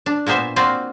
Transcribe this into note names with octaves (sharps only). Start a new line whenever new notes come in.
D4
A#2 A#3 B3 C5 E5
A#3 C4 F4 F#4 D5